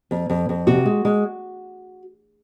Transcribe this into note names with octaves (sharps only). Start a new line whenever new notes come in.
F2
F2
F2
C3 F#4
G#3
G#3